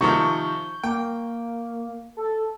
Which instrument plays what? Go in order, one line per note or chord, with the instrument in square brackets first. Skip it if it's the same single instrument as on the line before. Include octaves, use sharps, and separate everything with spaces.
[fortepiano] C3 D#3 F3 [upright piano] C#6 [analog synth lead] G6
[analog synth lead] A#3 [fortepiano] G5
[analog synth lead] A4